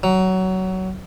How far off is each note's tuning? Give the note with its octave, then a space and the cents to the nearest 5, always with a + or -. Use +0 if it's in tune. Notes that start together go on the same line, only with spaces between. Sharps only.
F#3 +20